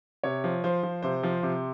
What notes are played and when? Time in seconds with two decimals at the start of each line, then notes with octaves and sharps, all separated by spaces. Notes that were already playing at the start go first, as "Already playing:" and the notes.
0.24 C3 C#5
0.44 F3
0.64 F3 C5
0.83 F3
1.03 C3 C5
1.23 F3
1.43 C3